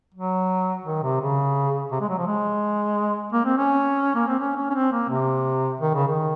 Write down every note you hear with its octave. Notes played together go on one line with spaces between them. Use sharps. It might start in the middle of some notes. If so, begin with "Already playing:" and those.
F#3
D#3
C3
C#3
C3
G#3
F#3
F3
G#3
A#3
C4
C#4
A#3
C4
C#4
C#4
C#4
C4
A#3
C3
D#3
C#3
D#3